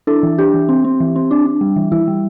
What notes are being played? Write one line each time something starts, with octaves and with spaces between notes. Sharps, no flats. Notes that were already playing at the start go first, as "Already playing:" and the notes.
D4 E4 A4
E3
D4 G4
E3
C4
C4
E3
C4
D4
D4
G3
E3
E3 E4
G3